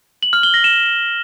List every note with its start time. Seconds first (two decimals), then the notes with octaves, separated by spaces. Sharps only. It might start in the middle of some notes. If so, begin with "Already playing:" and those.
0.23 F#7
0.33 F6
0.43 G7
0.54 A#6
0.64 E7